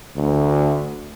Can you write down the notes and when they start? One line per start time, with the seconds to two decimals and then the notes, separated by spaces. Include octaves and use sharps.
0.16 D2